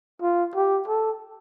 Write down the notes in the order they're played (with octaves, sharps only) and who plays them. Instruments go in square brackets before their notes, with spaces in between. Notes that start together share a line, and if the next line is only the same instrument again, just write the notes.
[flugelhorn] F4
G4
A4